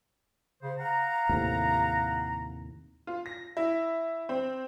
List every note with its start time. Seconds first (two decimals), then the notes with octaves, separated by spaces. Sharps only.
0.63 C#3 C5
0.78 F5 F#5 A#5
1.29 D#2 A2 C3
3.07 F4
3.26 A#6
3.57 E4
4.29 C4